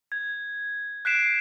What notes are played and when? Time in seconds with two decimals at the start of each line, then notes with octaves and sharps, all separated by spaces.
0.12 G#6
1.05 F#6 G6 B6 C7 D7 E7